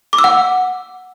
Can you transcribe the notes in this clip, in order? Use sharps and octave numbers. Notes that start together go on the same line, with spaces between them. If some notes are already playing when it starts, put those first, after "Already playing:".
D6
E6
F#5